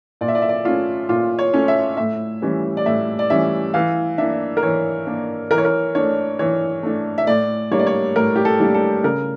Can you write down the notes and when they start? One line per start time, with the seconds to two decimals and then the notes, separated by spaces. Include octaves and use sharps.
0.21 A#2 D5
0.28 E5
0.35 D5
0.42 E5
0.49 D5
0.65 A3 C#4 F4
1.09 A#2 F4
1.39 C#5
1.53 A3 C#4
1.68 E5
1.97 A2 E5
2.42 E3 G3 C#4
2.77 D5
2.86 A2 E5
3.19 D5
3.30 E3 G3 C#4 E5
3.74 E3 F5
4.18 A#3 D4 E5
4.57 A#4
4.63 E3 C#5
5.07 A#3 D4
5.51 E3 A#4
5.58 C#5
5.65 A#4
5.95 A3 D4 C#5
6.39 E3 C#5
6.83 A3 D4
7.18 E5
7.27 A2 D5
7.71 G3 A#3 D4 C#5
7.79 D5
7.87 C#5
8.16 A2 A#4
8.36 G4
8.45 A4
8.60 G3 A#3 D4
8.74 A4
9.04 C#3 A#4